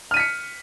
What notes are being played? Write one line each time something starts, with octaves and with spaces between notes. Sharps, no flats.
F6 B6 C#7 D#7